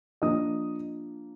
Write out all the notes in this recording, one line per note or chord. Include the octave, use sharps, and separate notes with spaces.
F3 A#3 D4 D#5 D#6